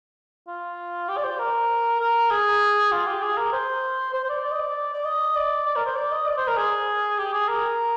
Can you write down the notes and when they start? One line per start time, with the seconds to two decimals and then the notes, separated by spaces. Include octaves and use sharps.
0.48 F4
1.09 G4
1.17 D5
1.24 C5
1.39 A#4
2.00 A#4
2.31 G#4
2.92 F4
3.07 G4
3.22 G#4
3.38 A#4
3.53 C5
4.13 C5
4.24 C5
4.29 D5
4.44 D5
4.51 D#5
4.59 D5
4.93 D5
5.05 D#5
5.35 D5
5.66 D5
5.76 A#4
5.86 C5
5.96 D5
6.12 D#5
6.27 D5
6.37 C5
6.48 A#4
6.57 G#4
7.18 G4
7.34 G#4
7.49 A#4